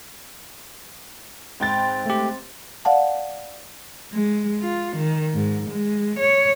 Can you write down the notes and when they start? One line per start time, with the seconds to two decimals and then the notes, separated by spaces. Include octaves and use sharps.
1.60 G#2 C4 B4 G5 A6
2.06 A3 G4
2.85 D5 F5 F#5 A5
4.13 G#3
4.62 F4
4.97 D#3
5.34 G#2
5.70 G#3
6.20 C#5